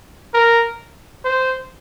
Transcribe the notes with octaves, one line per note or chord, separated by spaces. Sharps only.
A#4
C5